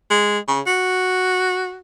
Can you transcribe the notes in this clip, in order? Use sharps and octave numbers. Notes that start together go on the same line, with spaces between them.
G#3
C#3
F#4